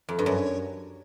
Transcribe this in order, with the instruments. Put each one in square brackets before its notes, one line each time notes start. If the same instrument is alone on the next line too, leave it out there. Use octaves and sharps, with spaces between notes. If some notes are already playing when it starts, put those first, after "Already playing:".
[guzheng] F2
G2
[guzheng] F#2 [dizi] C#5